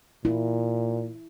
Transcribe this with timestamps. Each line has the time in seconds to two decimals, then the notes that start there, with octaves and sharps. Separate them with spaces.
0.25 A#2 E4